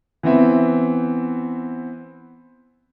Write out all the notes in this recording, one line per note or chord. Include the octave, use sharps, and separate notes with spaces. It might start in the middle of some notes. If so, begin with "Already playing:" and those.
E3 B3 C4 E5